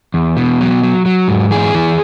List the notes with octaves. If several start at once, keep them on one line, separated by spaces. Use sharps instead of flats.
E2
B2
F#3
F#3
F#3
G#2
E3 G#4
E3